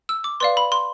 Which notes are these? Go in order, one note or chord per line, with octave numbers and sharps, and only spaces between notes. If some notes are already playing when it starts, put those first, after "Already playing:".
E6
D6
B4 D5 F5 C6
B5
C6